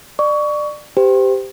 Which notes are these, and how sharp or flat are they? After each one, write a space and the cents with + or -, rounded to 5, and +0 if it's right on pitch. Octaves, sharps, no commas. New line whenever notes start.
D5 +25 C#6 +25
G4 +0 C5 -30